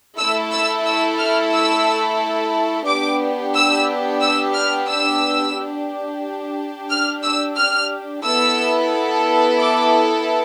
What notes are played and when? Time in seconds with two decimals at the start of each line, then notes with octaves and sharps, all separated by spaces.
0.17 A3 E4 A4 E6
0.52 E6
0.86 E6
1.18 F6
1.52 E6
2.86 B3 D4 G4 D6
3.54 E6
4.21 E6
4.54 F6
4.88 E6
5.56 D4 G4
6.90 F6
7.23 E6
7.57 F6
8.24 B3 E4 A4 E6
9.58 D6